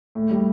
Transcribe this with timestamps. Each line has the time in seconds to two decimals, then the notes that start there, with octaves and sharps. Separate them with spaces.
0.15 A2
0.31 G3